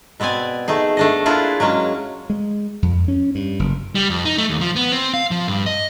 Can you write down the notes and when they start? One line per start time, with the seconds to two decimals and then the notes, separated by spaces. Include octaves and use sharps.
0.20 B2 B3 C4 D5 G#5
0.68 A3 D#4 G#4
0.97 A3 D4 D#5
1.26 A#3 D4 E4 F4 G#4 B4
1.60 F#3 G#3 A#3 C#4
2.30 G#3
2.82 F2
3.08 C#4
3.35 G2
3.59 F#1
3.95 G3
4.10 F2
4.25 D#4
4.38 A3
4.49 D#2
4.61 F3
4.76 B3
4.92 C4
5.13 F5
5.31 F3
5.48 G2
5.66 D#5